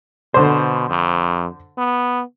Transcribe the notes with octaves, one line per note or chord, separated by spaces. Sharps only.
B2 D3 C5
F2
B3